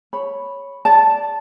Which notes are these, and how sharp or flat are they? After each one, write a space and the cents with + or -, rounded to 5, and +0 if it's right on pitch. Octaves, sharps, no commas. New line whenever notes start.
C#5 +0 B5 -5
D5 -15 A5 +0